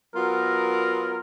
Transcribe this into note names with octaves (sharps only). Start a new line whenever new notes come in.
F#3 B3 F4 A#4